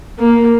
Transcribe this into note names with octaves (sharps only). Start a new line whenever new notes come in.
A#3